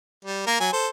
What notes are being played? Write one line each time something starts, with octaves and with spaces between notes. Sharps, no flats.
G3
A#3 A#4
F#3 G#5
A4 C5